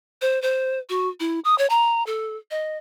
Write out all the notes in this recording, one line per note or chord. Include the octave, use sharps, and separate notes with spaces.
C5
C5
F#4
E4
D#6
C#5
A#5
A4
D#5